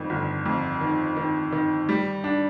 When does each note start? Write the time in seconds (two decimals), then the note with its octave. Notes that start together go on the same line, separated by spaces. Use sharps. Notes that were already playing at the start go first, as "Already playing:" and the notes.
Already playing: F2 D#3 G3
0.10 G1
0.46 F2
0.81 D#3
1.17 D#3
1.53 D#3
1.89 G3
2.24 D4